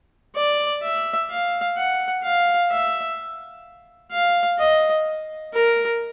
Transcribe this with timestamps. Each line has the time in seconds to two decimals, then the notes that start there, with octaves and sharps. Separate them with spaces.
0.35 D5
0.82 E5
1.30 F5
1.77 F#5
2.24 F5
2.71 E5
4.12 F5
4.59 D#5
5.54 A#4